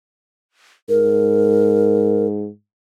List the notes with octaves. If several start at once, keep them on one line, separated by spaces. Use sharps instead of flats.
G#2 A#4